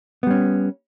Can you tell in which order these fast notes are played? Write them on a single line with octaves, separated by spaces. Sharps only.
B3 G3 C#4